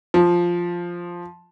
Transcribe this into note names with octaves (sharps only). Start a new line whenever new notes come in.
F3